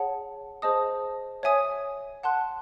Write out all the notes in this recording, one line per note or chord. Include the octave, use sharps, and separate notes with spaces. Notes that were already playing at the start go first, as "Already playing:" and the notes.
Already playing: G#4 C#5 F#5 A5
G#4 C5 D#5 A5 D#6
C#5 E5 G#5 D#6
F#5 A5 C6 F#6